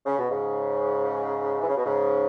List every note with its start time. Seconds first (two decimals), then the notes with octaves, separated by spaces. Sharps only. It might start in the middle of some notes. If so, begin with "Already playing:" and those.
0.06 C#3
0.18 B2
0.31 G#2 C#3
1.61 E3
1.69 C#3
1.77 B2
1.85 G#2 C#3